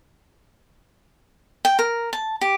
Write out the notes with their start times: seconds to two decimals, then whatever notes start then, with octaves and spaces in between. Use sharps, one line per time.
1.65 G5
1.79 A#4
2.13 A5
2.41 G4